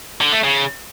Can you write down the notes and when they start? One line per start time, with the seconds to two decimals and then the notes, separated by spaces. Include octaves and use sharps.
0.21 D3
0.32 A3
0.44 C#3